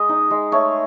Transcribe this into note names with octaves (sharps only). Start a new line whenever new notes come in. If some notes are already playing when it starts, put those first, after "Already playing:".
Already playing: G#3 D#5
D#4
G#3
A3 C#5